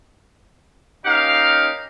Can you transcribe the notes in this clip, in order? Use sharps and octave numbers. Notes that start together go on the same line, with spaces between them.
A#3 C#4 D#4 G4 F5